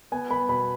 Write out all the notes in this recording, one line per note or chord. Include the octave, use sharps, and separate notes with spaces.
B3 G#5
B3 B5
B2 B5